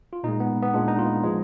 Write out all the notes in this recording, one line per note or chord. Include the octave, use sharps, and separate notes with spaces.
F4
A#2 G#3 D#4
B3
B3
A#2 G#3 D4
D#4
F4
F3 G#3